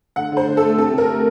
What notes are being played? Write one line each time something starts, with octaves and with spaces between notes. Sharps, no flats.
D3 F#5
D3
C5
D3
A3 A4
C3 A4
C3
A#4
A3